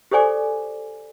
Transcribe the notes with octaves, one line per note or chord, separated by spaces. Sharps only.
G4 A4 C5 D5 G#5 D6